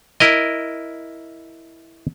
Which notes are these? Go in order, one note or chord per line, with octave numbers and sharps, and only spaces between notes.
E4 A#4 D#5